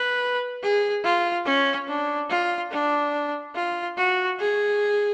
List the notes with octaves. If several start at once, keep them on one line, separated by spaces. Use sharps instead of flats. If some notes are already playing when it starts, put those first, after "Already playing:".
Already playing: B4
G#4
F4
C#4
D4
F4
D4
F4
F#4
G#4